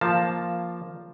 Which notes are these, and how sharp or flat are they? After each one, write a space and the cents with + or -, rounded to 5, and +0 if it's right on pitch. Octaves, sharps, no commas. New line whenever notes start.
F3 -5 A#3 +0 A5 +0